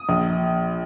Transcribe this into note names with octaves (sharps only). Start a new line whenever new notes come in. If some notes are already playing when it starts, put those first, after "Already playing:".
Already playing: D#6
A#1